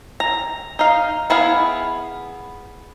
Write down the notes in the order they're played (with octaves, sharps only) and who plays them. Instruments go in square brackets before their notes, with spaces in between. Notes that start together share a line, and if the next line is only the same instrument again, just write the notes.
[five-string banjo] A#5
D#4 F5
B3 E4 G#4 F5